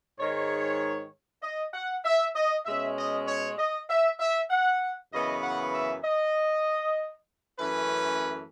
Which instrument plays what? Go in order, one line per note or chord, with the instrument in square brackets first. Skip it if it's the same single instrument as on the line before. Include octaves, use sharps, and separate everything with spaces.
[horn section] G#2 D#3 G#3 C#5
D#5
F#5
E5
D#5
B2 G#3 C#4 E5
D#5
C#5
D#5
E5
E5
F#5
F#2 C#3 E3 B3 D#5
F#5
E5
D#5
F#2 E3 A3 C#4 B4